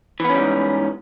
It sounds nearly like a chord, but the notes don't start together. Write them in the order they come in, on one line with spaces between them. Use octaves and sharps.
E3 B3 C#4 G3 G#2